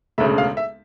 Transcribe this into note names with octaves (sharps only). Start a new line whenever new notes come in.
E1 D2 C#3 E5
F5
E5